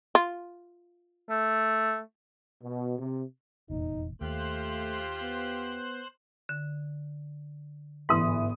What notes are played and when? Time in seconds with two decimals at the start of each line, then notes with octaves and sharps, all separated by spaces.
0.15 F4
1.29 A3
2.64 B2
2.99 C3
3.70 F1 E2 A#2 D#4
4.21 D#2 A3 F4 G4 C5 F#6
5.22 B3
6.49 D3
8.09 G1 G#2 E3 D#6